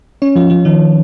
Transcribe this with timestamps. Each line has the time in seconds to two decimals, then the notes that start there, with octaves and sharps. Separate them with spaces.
0.22 C#4 C#5
0.36 F3 F4
0.50 F3 F4
0.65 D#3 D#4